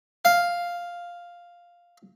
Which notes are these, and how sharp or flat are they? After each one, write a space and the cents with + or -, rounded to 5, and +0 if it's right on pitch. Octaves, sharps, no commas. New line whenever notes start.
F5 +0